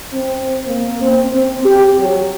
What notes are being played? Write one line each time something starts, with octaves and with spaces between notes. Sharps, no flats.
C4
A#3
C4
C4
G4
F#3